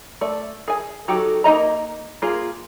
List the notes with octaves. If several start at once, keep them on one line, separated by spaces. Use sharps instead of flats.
A3 D5
G#4 G#5
F#3 D#4 F#4 G4 A4
A#3 D#4 D#5 A#5
A#3 F4 G#4